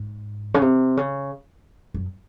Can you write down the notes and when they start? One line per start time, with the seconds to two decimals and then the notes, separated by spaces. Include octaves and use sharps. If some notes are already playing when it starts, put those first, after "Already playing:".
Already playing: G#2
0.54 C#3
0.62 C3
0.97 C#3
1.94 F#2